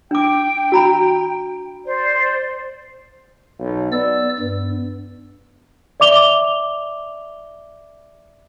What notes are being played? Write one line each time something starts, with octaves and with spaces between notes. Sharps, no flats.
D4 G5 D6
F#4 A#5 B5
C5 D5
B1
B3 D5 E6
G2 B3
D5 E5 D6 F7 G7